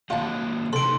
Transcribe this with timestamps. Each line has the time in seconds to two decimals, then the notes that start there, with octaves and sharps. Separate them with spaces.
0.10 F#3 A#3 F4 D#5 A5
0.73 C3 D#4 A4 C6 D7